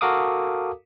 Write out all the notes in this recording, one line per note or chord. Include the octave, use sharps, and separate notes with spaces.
F#4 A4 A#4 F5 D6 D#6